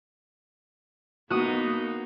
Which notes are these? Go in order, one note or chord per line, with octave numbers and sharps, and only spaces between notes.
A#3 B3 D#4 F#4 D#6